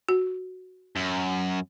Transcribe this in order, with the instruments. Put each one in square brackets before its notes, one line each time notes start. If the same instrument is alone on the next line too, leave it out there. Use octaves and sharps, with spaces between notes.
[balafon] F#4
[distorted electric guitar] F#2